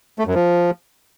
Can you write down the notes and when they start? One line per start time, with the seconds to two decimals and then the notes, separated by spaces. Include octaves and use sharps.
0.19 A3
0.27 F#2
0.34 F3